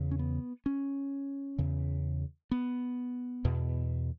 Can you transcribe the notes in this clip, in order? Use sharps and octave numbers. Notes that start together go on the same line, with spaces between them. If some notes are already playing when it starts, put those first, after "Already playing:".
Already playing: E2 C#3
C#4
B3
C#4
E2 C#3
B3
E2 B2